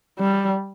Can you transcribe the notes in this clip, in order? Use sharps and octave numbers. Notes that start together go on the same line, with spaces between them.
G3